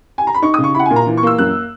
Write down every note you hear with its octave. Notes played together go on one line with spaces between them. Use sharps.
G#5
A#5
B5
D#4 C#6
C#3 D#6
C#6
E4 F#5 B5
G#5
A#2
A#5
E3
C#6
A#3 E6
F#2 F#6